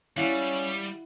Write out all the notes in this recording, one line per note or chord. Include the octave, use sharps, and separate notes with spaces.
G3 C#4 E4 F5 F#5